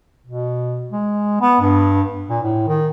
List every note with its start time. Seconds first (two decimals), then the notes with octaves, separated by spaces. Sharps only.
0.27 B2
0.91 G#3
1.41 B3
1.61 G2
2.30 A#2
2.43 A2
2.68 D#3